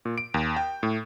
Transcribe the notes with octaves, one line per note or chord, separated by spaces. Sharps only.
A#2
D7
D#2
G5
A2